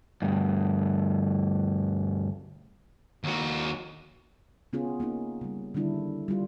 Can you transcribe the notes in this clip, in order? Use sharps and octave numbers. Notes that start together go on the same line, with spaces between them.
D2 G2
D#2 F#4
C#3 B3 C#4 F4 G#4
A#3 C#4 D#4
C#3 G3
D3 D#3 G3 D4 E4
G3 F4